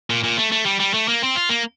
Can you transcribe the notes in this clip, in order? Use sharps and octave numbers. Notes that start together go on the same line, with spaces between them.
A#2
A#2
A3
A3
G3
G3
A3
A#3
C4
F4
A#3